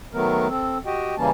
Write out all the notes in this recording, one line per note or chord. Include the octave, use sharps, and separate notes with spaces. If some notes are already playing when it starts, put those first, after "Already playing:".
D#3 F#3 A3 B3 A#4
C4 A4
F#4 G4 D#5 G5
C#3 E3 G3 A#3 C#4 A5